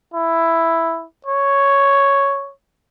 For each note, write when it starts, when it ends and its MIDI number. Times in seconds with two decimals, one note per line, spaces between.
0.14 1.05 64
1.27 2.52 73